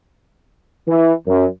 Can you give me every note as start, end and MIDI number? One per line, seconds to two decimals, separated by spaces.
0.88 1.13 52
1.27 1.46 42